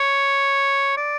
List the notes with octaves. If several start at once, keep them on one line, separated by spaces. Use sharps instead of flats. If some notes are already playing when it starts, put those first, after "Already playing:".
Already playing: C#5
D5